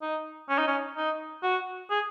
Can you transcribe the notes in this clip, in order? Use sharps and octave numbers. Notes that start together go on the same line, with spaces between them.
D#4
C#4
D#4
C#4
D#4
F#4
G#4